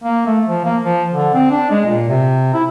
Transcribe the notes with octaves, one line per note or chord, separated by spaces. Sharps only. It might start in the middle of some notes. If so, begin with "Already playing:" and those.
A#3
A3
F3
A#3
F3
D3
C4
D4
G#3
A#2
C3
E4